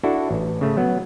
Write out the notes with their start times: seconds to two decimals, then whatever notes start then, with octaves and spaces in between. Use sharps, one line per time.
0.03 D4 E4 F#4 A4
0.31 A1
0.61 C#3 A3
0.77 F#3 B3